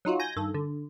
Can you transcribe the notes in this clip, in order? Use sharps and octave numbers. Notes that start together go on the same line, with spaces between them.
F#3 D#4 F4 F#4
G#5 G6 A#6
G2 D#3 A4
D3